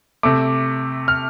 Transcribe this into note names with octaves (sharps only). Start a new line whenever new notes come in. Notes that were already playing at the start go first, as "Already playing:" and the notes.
C3 A3 D6
F6